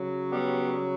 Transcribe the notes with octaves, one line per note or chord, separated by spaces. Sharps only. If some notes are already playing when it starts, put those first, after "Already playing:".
Already playing: C#3 F#3
G3 B3